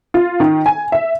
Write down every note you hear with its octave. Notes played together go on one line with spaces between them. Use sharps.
F4
D#3
G#5
E5